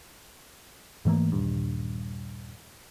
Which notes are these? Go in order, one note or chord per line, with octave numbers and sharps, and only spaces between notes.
G#2 E3 A3 A#3
D#1 G2